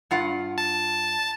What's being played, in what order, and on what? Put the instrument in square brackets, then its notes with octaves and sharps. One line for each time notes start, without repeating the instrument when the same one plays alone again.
[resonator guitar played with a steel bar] G2 F4 F#5
[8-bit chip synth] A5